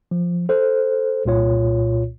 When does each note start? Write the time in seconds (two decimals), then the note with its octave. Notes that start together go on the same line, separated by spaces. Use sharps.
0.11 F3
0.49 A4 C5
1.25 C2 A#2 F4 C#5